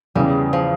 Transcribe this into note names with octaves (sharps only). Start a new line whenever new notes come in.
E2 C#3 E3 G3
F3